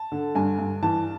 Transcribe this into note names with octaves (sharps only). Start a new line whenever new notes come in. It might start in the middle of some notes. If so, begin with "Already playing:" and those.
Already playing: A5
D3
G2 G#5
G2
E3 A5